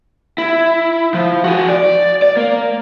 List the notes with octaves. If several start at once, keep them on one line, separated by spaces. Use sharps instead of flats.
E4
F3
F#4 G#4
D5
D5
A#3